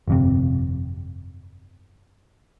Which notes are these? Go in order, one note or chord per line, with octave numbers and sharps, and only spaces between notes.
G1 F2 C3